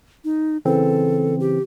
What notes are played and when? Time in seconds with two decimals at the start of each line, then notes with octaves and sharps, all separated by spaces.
0.24 D#4
0.65 C#3 E3 C4 A4
1.40 G4